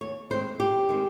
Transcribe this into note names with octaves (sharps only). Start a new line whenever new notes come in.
D#2 C#5
D#3 G#3 C4 C5
D#2 G4
D#3 G#3 C4